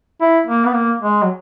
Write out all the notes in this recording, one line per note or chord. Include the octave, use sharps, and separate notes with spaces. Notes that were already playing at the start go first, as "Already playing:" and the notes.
E4
A#3
B3
A#3
G#3
F#3